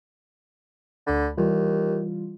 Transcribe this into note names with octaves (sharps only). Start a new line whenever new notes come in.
D2 D3 B5
D#2 E3 G3 F4